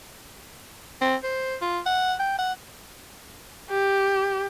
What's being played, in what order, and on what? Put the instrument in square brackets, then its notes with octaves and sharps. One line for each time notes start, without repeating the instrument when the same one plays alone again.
[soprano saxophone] C4
C5
F4
F#5
G5
F#5
[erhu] G4